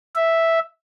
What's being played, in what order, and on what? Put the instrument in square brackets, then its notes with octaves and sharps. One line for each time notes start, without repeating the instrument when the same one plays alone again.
[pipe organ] E5